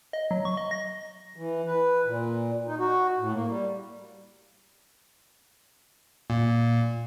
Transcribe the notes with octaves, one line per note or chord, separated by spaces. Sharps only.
D#5
F#3
C#6
D#5
A#6
E3
B4
A#2
D#4
F#4
A2
A#3
G3
A#2